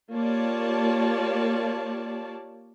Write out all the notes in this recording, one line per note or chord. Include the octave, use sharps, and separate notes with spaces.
A#3 F4 G4 C#5 D5 A5